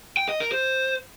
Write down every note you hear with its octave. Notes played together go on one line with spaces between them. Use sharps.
G5
D#5
A#4
C5